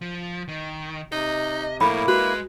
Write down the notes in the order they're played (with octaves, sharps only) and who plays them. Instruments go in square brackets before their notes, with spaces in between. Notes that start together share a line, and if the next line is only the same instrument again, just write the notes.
[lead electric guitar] F3
D#3
[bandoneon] C3 [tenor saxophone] D#4 [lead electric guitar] D#5
[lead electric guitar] F2 A#4 [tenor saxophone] A2 [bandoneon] A#3 E4 [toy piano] B5
[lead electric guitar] G#3 [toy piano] F#4 [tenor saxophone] B4